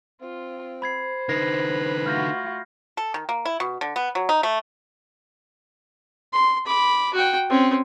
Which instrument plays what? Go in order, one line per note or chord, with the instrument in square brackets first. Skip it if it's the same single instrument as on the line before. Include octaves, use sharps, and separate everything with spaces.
[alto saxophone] C4 [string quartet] F4
[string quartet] C5 [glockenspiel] B5 G#6 C7
[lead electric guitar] D3 D#4 [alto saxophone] B4 [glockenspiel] G#6 A#6 C7
[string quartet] A3 F4 F#4 [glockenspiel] F6 G6 A#6
[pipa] A4
D#3
A#3
E4
B2
D3
B3
F#3
D#4
A3
[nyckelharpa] C6
B5 D6
F#4 G5
C4 C#4